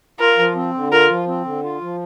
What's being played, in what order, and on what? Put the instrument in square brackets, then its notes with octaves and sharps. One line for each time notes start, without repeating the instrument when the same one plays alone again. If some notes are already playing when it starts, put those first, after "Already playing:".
[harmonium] F4 [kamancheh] A#4
[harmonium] F3
C4
D3
[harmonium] F4 [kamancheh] A#4
[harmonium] F3
C4
D3
F4
F3